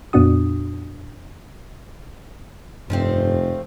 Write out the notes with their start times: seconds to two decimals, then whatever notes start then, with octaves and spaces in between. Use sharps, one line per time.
0.13 F2 A#2 B3 D4 F#4 D#6
2.90 F1 G2 F3 A3 C4